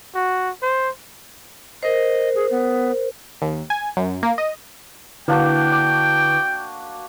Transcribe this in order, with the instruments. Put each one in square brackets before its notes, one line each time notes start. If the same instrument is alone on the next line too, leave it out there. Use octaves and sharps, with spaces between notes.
[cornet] F#4
C5
[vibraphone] A#4 C5 [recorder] D#5
[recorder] G#4
B3
[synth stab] D#2
G#5
F#2
A#3
D#5
[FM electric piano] D3 E4 B4 [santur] A#3 D4 F#4 [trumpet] G5
[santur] D6